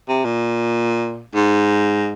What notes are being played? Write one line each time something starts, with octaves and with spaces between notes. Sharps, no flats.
C3
A#2
G#2